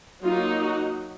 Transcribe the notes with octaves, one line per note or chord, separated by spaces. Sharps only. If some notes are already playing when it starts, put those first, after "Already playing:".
F#3 A#3 D#4 F4
F#4